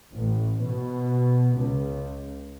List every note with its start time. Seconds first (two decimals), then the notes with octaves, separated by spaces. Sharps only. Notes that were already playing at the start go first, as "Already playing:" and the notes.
0.13 A1
0.61 B2
1.56 C#2